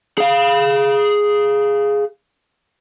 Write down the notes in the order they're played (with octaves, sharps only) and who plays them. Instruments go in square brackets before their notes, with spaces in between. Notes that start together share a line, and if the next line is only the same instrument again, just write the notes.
[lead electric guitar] G#4 F5